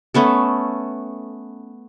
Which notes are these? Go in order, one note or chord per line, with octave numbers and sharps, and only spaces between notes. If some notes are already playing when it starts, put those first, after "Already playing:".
A3 B3 C#4 A4